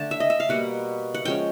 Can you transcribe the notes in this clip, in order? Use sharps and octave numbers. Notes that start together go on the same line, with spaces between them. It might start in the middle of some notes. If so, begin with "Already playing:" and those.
Already playing: D3 A3 A5
E5
D#5
E5
F5
B2 G3 A#3 F#5
F#5
F3 G#3 C#4 G5